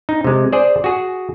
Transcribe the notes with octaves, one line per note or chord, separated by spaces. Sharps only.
D#4
C3 G#3
G#4 C5 D5
F#4 G#4